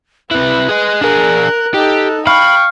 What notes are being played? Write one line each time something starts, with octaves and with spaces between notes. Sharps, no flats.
C3 E4 B4 F#6
G#4 D#5
D4 G#4 A#4
D#4 G4 A4
F5 G5 B5 C#6